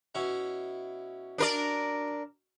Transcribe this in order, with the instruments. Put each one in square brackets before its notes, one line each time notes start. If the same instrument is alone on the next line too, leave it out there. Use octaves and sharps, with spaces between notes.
[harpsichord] B2 C#4 E4
[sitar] D4 A#4 D5